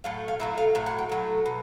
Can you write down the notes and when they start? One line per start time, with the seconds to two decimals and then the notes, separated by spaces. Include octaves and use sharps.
0.04 A2 F#3 A3 F5
0.28 F5
0.40 A2 F#3 A3 E5
0.58 F5
0.75 A2 F#3
0.86 F#5
0.98 G5
1.09 A2 F#3 A3
1.46 B2